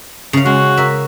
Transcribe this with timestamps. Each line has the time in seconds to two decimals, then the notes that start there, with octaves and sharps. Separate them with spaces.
0.33 C#3 F5
0.46 G#3 F#4
0.77 A#4 E5